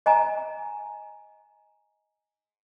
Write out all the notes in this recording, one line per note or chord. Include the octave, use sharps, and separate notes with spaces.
D#5 G#5 A#5